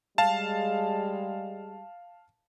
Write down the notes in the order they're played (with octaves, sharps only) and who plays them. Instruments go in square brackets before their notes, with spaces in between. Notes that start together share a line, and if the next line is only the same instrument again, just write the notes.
[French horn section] G3 G#3 [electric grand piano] F5 A5